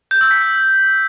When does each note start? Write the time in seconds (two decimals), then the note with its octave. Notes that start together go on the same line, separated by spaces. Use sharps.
0.11 G6
0.21 E6
0.31 B6